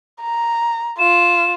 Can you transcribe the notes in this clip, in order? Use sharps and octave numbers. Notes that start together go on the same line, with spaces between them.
A#5
F4 E7